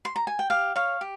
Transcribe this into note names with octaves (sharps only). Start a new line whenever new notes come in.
C6
A#5
G#5
G5
G4 F5
C#5 F5
G4